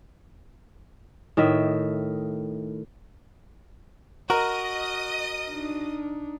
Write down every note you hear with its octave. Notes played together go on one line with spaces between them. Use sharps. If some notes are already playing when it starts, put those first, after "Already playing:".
A2 D#3 D#5 E5
F#4 A#4 D#5 D#6
D4 D#4